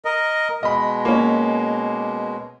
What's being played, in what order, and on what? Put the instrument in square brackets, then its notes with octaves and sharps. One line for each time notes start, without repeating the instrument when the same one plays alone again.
[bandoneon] A#4 D#5
[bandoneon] B2 G#3 [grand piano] D#5 B5
[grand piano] A#3 C#4